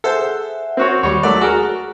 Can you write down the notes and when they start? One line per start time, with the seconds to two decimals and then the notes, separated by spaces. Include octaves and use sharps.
0.04 G#4 A4 C5 E5 F#5
0.77 C4 F#4 C#5
1.03 D#2 G3 C#5
1.23 F#3 A3 D5 F#5
1.41 F#4 G#4 A#4